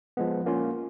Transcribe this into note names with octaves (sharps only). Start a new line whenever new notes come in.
F3 G#3 B3
A#3 C#4 F4